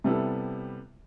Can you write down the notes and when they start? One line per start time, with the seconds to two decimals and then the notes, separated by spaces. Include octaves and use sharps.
0.04 C3 G3 B3 E4 A4